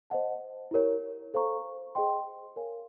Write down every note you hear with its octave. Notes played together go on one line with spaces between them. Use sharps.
C5 D#5 F#5 A5
E4 G4 A#4 C#5
A4 C5 F5 A#5 C#6
G#4 C5 D#5 G5 C6
A#4 C#5 F5 G#5